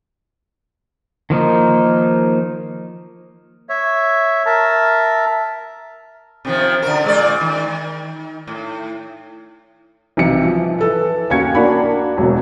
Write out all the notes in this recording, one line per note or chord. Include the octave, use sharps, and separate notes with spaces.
D#3 F3 A#3 D#4
C#5 E5
A#4 E5 A5
C3 D#3 F3
D3 A#4
A#2 G#3 D5
D#3
A2
B1 C3 E3 C#7
F3
A4 B4
D#2 C#4 F#4 F5 G#6 C#7
A#3 D4 F#4 B5
E1 B2 F#3